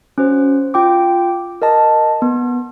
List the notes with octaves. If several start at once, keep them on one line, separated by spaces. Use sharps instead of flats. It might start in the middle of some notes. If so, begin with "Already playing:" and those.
C#4 F#4 C5
F4 G5 D6
A#4 D#5 A5
B3